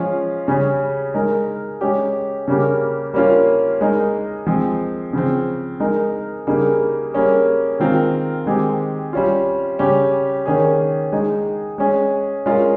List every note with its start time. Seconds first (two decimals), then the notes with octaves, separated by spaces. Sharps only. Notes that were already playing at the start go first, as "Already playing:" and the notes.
Already playing: F3 G#3 C#4 F4
0.48 C#3 G3 C#4 G#4
1.14 G#3 D#4 A#4
1.81 G#3 C#4 G4
2.48 C#3 G3 A#3 C#4 G4
3.14 G3 A#3 C#4 F4
3.81 G#3 D#4 A#4
4.47 F3 G#3 C4
5.13 C#3 F3 C4
5.80 G#3 D#4 A#4
6.47 C#3 G3 A#3 D#4 G#4
7.13 G3 A#3 C#4 G#4
7.80 D#3 G#3 C4 F4 A#4
8.46 D#3 G#3 C4 G4
9.13 G3 C#4 F4
9.79 C#3 G3 C#4 G4
10.46 D#3 A#3 C#4 G#4
11.12 G#3 D#4 G#4
11.78 G#3 C#4 G#4
12.46 G#3 C#4 F4 A#4